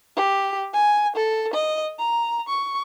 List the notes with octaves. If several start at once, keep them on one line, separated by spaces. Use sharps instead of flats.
G4
G#5
A4
D#5
A#5
C#6